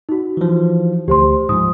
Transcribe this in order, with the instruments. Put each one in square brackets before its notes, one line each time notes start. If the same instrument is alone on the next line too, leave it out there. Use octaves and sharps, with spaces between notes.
[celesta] D#4 F#4
[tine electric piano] E3 F3
[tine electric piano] D2 [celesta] G4 C5 C6
[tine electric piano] G#2 F3 [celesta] D#6